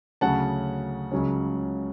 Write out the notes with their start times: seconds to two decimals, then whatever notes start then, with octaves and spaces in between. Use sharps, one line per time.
0.21 D2 C#3 F#3 C#4 F#5 A5
1.12 C#2 C#3 F#3 C#4